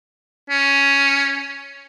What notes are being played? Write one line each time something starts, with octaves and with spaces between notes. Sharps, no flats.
C#4